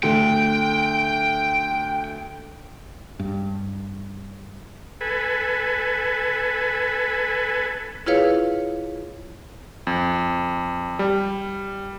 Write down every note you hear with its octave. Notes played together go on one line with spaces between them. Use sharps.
D2 D3 G5
G2
A4 B4 G#5
E4 F4 G#4 B4 C#5 F5
F2
G3